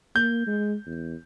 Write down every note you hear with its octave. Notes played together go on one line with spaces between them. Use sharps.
A#3 G6
G#3
E2